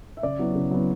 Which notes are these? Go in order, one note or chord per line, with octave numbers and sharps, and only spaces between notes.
E5
C#3 D5
F#3 B3 E4
C#3
F#3 B3 E4